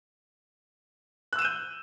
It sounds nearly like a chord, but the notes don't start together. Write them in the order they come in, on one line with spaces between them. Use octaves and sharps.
F#6 E6 E7 D#7 G6